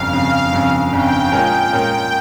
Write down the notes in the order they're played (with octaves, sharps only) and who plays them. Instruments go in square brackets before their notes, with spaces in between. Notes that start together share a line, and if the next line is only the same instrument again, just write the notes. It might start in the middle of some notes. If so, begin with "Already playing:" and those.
Already playing: [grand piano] G1 F2 C#3 [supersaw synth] F5
[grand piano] G1 F2 C#3 [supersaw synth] F5
[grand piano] G1 F2 C#3
[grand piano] G1 F2 C#3 [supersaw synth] G5
[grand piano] A#2 G#3 C#4 F4 A#4
A#2 G#3 C#4 F4 A#4